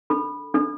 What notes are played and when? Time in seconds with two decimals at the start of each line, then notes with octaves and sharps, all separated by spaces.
0.10 D4 A4 B5
0.54 D4 A4